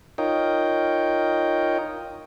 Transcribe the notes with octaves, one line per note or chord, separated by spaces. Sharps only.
D#4 F4 A#4 C#5 D#5 G5